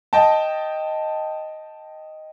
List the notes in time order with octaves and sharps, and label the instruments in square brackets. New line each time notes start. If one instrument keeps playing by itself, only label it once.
[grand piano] D#5 G5 A5